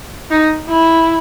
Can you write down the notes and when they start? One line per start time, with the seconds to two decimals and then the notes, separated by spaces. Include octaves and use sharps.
0.31 D#4
0.69 E4